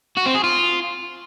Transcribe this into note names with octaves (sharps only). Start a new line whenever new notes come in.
F#4
C4
G#4
F4